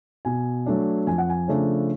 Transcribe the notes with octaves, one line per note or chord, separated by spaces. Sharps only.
B2 G#5
F#3 A3 D4
F2 G#5
F#5
G#5
C#3 F3 A3 D4